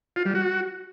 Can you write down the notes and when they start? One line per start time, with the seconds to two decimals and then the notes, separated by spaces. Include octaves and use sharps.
0.16 F4
0.26 G3
0.35 F#4